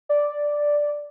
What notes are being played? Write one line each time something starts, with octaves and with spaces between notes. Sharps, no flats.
D5